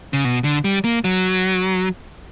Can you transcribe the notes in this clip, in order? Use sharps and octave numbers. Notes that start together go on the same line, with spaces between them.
C#3
B2
D3
G3
A#3
F#3